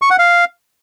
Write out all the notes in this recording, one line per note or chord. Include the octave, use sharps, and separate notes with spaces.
C#6
F#5
F5